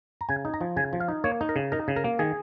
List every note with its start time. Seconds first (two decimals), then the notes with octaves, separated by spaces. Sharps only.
0.21 A#5
0.29 C#3 G#5
0.45 D#4
0.54 A#5
0.61 F3
0.76 C#3 G#5
0.93 F3
1.00 F5
1.08 D#4
1.24 A#3 C#5
1.41 D#4
1.49 A#4
1.56 C#3
1.72 D#4 A#4
1.88 C#3
1.96 A#4
2.04 A#3
2.19 D#3 G#4